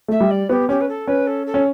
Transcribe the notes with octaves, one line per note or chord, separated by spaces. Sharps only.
A3 E5
G3
D5
B3 G4
C#4 G4
B4
A4
C#4 B4
A4
A4
C#4